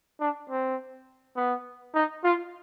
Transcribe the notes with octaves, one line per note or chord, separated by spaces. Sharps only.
D4
C4
B3
D#4
F4